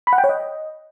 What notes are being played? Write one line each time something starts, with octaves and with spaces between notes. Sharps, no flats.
B5
F#5
G5
C#5
D#5